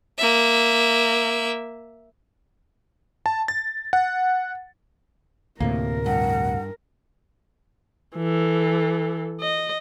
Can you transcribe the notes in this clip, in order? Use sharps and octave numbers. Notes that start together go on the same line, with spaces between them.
A#3 E5
A5
A6
F#5
D2 A2 C3 A#3 A#4
G2 F#5
E3 A4
D#5